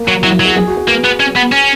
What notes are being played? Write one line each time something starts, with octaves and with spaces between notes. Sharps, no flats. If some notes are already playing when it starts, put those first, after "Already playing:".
Already playing: A#3
F#3
F#4
F#3 E4
F#4
F#3
G#4
G#4
F#4
G#4
A#3 B4
B3
C#4
B3
C#4